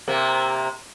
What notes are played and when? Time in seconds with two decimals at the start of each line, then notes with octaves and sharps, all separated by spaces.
0.08 C3 A#3